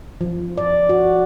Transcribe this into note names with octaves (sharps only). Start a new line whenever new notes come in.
F3
D5
F#4